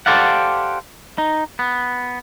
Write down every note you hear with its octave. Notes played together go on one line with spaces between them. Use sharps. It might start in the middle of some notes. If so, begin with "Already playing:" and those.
G4 A4 C5 D5 F5 F#5
D#4
B3